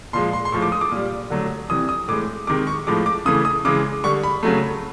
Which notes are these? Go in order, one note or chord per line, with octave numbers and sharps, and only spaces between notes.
A#2 F3 G#3 C6
C6
C6
A2 F3 G#3 C#6
D6
D#6
D6
A#2 G3
D3 F#3 A3
C3 E3 G3 D#6
D#6
A2 E3 G#3 D6
C3 D#3 G#3 D6
C#6
A2 F3 G#3 D6
D6
C#3 E3 A3 D#6
D#6
C#3 E3 G#3 D6
D3 G3 C#6
B5
C#3 F#3 A3